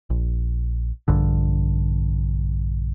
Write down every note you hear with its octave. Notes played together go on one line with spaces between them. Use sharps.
A#1
A#1 G2 D3